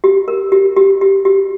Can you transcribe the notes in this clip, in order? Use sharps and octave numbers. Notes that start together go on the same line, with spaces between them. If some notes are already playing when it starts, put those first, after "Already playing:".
G4
A#4
G4
G4
G4
G4